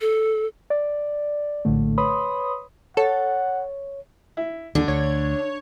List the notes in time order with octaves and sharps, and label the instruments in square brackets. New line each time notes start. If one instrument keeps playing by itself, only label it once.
[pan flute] A4
[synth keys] D5
A#1 A2 D3 A3
B4 C#5 B5 C6 D#6
[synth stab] A4 [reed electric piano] C#5 [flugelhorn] F#5
[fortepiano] E4
[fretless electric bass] D#2 [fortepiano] D3 [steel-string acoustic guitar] D4
[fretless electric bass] D2 [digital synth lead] C#5